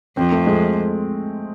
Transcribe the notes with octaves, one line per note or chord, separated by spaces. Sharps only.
F2 C4
A3
G#3